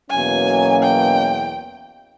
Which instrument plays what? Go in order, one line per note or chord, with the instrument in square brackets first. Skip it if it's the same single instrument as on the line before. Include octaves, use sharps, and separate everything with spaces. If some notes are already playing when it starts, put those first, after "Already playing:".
[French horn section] E2 B2 F#3 A#3 C#4 [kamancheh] G#5
[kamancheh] G5